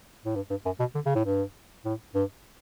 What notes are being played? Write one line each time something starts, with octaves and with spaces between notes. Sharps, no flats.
A2
G2
G2
F#2
B2
D3
C#3
A2
G2
A2
G2